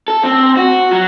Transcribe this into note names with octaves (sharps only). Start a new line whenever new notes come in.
A4
C4
F#4
F#3